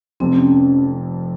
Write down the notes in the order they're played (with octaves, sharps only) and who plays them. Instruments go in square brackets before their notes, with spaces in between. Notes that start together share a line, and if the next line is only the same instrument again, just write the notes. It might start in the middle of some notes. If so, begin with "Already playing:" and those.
[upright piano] F1 F2 C3 [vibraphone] C4
[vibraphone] C#4